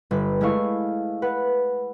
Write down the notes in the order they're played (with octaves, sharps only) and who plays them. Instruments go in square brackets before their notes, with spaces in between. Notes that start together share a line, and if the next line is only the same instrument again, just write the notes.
[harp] G1 B4 B6
G#3 A3 E4 F5 C#6
B4 F#5